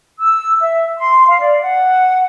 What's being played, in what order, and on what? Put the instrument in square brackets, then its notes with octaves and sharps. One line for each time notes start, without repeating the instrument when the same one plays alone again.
[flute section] E6
E5
C6
F5
D5
F#5